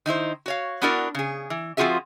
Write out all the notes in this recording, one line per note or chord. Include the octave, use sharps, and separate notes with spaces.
D#3 D#4 E4 C5
F#4 C#5 F5
B3 D4 E4 F#4 A#4 D5
C#3 G#4
E3
F3 C4 F4 F#4 G#4 E5